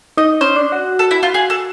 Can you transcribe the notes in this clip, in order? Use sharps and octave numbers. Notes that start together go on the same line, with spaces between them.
D#4 D#5
C#4 C5
D4
F#4
A4
E4
F4
G#4
A4